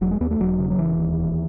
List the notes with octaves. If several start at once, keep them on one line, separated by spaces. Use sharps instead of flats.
E1 F#3
G#3
D#2 B3
A3
E1 F#3
C#3
F#3
E1 E3
D#2
E1